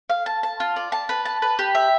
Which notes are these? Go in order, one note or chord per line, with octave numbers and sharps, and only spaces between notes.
F5
A5
A5
F4
D5
A5
B4
A5
B4
G4
E5